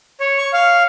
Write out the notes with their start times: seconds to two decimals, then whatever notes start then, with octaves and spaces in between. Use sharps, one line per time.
0.20 C#5
0.38 C#6
0.53 F5